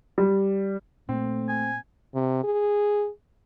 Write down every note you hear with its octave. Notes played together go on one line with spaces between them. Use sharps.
G3
A#2 A3 C4
G#5
C3
G#4